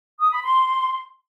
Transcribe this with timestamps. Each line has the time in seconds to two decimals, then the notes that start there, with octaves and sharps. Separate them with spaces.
0.20 D#6
0.31 B5
0.42 C6